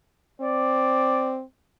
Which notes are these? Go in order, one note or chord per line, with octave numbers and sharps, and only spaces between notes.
C4 D5